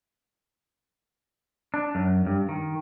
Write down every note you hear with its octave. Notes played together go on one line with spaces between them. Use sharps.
D4
F#2
G2
D#3